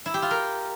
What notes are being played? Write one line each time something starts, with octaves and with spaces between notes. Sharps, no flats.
E4
G4
F4
A#4